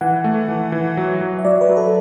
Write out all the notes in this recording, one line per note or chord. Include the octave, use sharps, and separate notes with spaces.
E3 F#5
A3
E3
E3
F#3
F#3
E5
F#3 D5
B4
F#3
A4